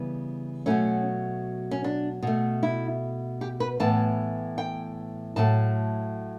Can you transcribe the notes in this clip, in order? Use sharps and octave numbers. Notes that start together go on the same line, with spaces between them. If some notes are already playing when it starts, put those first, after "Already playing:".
Already playing: C#3 E3 G3 B3
B2 F#3 A3 C#4
C#4
D4
B2 A3
E4
G4
B4
A2 E3 B3 A5
G5
A2 F#3 A3 A5